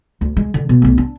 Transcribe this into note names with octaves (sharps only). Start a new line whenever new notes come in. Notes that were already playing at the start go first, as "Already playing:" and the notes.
D2
G#3
D3
B2
B1 A3
D4